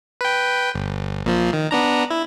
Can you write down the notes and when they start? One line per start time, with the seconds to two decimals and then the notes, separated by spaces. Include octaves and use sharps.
0.21 B4 G5
0.75 G1
1.25 A#1 A#2 F3
1.53 D#3
1.71 B3 D4 A#5
2.10 E4